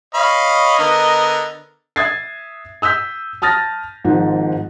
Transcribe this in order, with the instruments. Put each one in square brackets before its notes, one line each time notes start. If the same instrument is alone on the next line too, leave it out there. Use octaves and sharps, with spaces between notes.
[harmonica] C#5 F5 B5 [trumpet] D#5
[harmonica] D3 B3 A#4
[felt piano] E5 D#6 G#6 A6 C7
D#6 E6 G6 B6
A5 D#6 F6 A6 A#6
G#1 G#2 F3 D#4